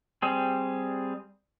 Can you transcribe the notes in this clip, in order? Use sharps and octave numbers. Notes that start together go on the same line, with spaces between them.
G3 C4 G#4